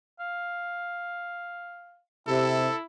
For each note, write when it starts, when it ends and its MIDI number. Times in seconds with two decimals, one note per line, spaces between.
0.20 2.00 77
2.28 2.67 48
2.28 2.83 64
2.28 2.76 69